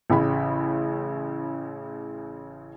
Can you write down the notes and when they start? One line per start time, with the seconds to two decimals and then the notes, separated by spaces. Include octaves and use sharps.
0.10 A1 C#3 B5